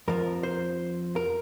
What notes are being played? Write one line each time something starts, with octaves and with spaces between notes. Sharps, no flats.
F2 F3 A#4
C5
A#4